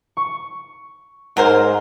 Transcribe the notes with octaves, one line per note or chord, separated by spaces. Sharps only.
C#6
G#2 F#3 A#4 C5